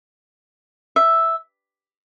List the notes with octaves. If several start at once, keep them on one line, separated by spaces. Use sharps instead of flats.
E5